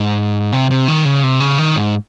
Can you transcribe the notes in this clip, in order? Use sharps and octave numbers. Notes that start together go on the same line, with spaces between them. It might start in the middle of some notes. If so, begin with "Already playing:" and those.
Already playing: G#2
C3
C3
D#3
C#3
C3
C#3
D#3
G#2